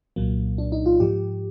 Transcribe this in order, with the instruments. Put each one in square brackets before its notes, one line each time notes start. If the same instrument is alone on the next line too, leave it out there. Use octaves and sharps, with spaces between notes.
[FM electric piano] C2 A#2 F#3 A#3
D4
D#4
F4
G#2 F3 G4